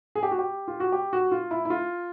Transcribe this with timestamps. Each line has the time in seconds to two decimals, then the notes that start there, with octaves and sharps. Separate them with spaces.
0.15 G#4
0.23 G4
0.31 F#4
0.38 G4
0.68 F4
0.80 F#4
0.92 G4
1.13 F#4
1.32 F4
1.51 E4
1.65 E4
1.70 F4